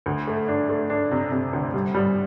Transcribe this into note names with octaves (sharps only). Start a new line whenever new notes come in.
D2
A3
D4
A3
D4
C3
C3
D2
G3
G3